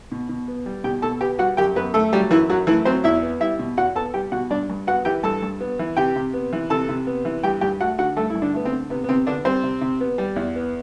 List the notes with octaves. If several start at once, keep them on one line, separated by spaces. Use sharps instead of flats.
B2
B2
B3
G3
B2 G4 G5
B2 A4 A5
B3 G4 G5
G3 F#4 F#5
F#2 G4 G5
F#2 B3 B4
A3 A4
F#3 G3 G4
F#2 E3 E4
F#2 F#3 F#4
E3 A3 E4
F#3 C4 C5
E2 E4 E5
B3
G3 E4 E5
B2
E2 F#4 F#5
B3 A4 A5
G3 G4 G5
B2 F#4 F#5
G2 D4 D5
G2
B3 F#4 F#5
E3 G4 G5
G2 A4 A5
G2
B3
E3
C3 G4 G5
C3
B3
E3
C3 A4 A5
C3
B3
E3
G2 G4 G5
G2 G4 G5
A3 F#4 F#5
D3 F#4 F#5
G2 A3 A4
E4
G2
D3 D4
A3 B3
C4
D3
C3 B3
B3
C3 C4
D3 B3 D4
G3 C4 C5
C3
C3
B3
G3
E2
B3